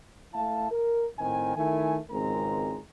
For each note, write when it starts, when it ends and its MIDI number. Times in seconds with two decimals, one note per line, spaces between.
0.34 0.68 57
0.34 0.68 64
0.34 0.68 77
0.34 0.68 81
0.70 1.04 70
1.18 1.54 45
1.18 1.54 51
1.18 1.54 60
1.18 1.54 80
1.55 1.97 51
1.55 1.97 57
1.55 1.97 64
1.55 1.97 70
1.55 1.97 80
2.10 2.77 32
2.10 2.77 37
2.10 2.77 56
2.10 2.77 60
2.10 2.77 70
2.10 2.77 82